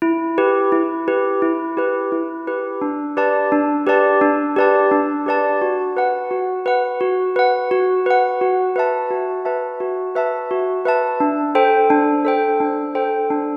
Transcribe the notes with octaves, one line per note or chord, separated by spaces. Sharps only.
E4
G4 B4
E4
G4 B4
E4
G4 B4
E4
G4 B4
D4
G4 B4 D5 A5
D4
G4 B4 D5 A5
D4
G4 B4 D5 A5
D4
G4 B4 D5 A5
F#4
B4 F#5
F#4
B4 F#5
F#4
B4 F#5
F#4
B4 F#5
F#4
B4 E5 A5
F#4
B4 E5 A5
F#4
B4 E5 A5
F#4
B4 E5 A5
D4
A4 C5 G5
D4
A4 C5 G5
D4
A4 C5 G5
D4